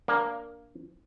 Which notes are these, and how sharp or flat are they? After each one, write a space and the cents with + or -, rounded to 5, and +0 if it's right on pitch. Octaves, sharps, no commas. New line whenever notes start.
A#3 +0 D4 -10